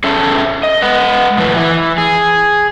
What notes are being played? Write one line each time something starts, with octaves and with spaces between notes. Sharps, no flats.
C#4 G#4 A4 E5
D#5
G#3 B4 F#5
F#2 A2 E3 B4
E3
G#4